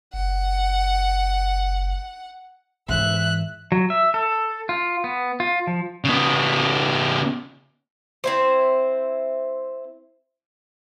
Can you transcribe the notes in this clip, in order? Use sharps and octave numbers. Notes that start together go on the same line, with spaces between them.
F#1 F#5
G#2 E3 E5 F#6
F#3
E5
A4
F4
B3
F4
F3
C#3 B3
C4 E4 C5